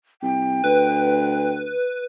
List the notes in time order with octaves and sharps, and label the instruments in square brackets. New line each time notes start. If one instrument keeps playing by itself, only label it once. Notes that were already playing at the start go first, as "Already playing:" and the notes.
[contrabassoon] C2 [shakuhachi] G5
[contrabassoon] D2 [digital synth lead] B4